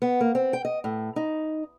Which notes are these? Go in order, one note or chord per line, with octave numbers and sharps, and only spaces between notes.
B3
A#3
C4
G5
D#5
A2
D#4